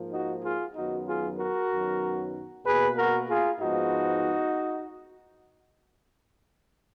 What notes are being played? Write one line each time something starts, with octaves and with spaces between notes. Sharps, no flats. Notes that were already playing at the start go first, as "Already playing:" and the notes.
Already playing: G#2 F3 A#3
D#4 F#4
F4 G#4
F#2 D#3 F#3 B3 D#4 F#4
F4 G#4
F#4 A#4
F#2 D#3 F#3 B3
B2 A#3 G#4 B4
F#4 A#4
F4 G#4
G#2 F3 G#3 B3 D#4 F#4